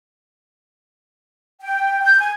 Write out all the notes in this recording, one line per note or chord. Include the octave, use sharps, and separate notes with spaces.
G5
G6
G#5